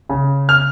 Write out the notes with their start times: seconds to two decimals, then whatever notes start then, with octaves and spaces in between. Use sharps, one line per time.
0.09 C#3
0.49 F6